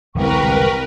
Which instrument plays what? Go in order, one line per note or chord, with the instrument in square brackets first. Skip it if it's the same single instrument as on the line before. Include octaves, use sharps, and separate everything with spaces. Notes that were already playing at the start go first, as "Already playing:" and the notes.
[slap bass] E1 D3 G#3 [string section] C2 [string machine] A#4 B4 [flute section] G5 C#6